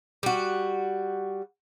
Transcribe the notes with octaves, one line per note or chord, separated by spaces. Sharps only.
G3 F#4